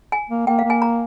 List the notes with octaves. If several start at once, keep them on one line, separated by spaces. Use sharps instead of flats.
G#5
A#3
A#3 G5
F5
A#3
G#5
A#5